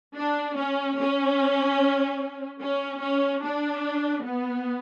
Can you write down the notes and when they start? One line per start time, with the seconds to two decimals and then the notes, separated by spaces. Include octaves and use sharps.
0.16 D4
0.57 C#4
0.98 C#4
2.61 C#4
3.01 C#4
3.43 D4
4.24 B3